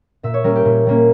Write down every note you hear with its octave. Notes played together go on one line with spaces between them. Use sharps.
A#2 E5
C#5
G3 A#3 C#4 A#4
G4
A#2
G3 A#3 C#4